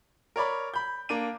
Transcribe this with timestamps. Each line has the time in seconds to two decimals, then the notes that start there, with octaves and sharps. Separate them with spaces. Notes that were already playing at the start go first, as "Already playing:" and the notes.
0.36 A#4 C#5 D5 B5
0.74 B5 G6
1.09 A#3 D4 D#7